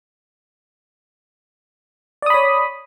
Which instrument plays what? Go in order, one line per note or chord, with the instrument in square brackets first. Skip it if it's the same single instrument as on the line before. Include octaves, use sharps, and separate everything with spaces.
[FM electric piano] D5
D#6
B5
C#5